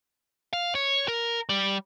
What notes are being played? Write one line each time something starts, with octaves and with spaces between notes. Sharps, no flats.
F5
C#5
A#4
G3